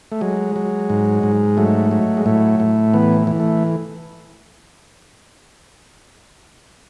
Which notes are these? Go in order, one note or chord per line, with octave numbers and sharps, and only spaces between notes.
A3
F#3 G#3
F#3
G#2
G#2
F#3 A3
F#3
G#3
A2 A3
A2
E3 B3
E3
A3